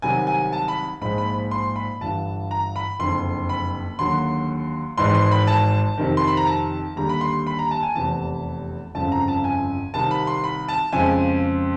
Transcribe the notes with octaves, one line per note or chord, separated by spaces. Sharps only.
C2 C3 D#3 F#3 G#5
G#5
A5
B5
A#1 G#2 F3 G#3 B5
B5
B5
C6
B5
G1 G2 E3 A5
A#5
B5
F#1 F2 D3 C6
B5
D#2 D3 F#3 C6
G#1 G#2 E3 G#3 C6
C6
B5
A5
F2 C3 D#3
C6
B5
A#5
A5
D#2 D3 G3 A#5
B5
C6
B5
A#5
A5
G#5
F1 E2 C3 E3 A5
G1 F2 C#3 A5
A#5
A5
G#5
C2 C3 D#3 A5
B5
C6
B5
A5
F2 C#3 F3 G#3 G#5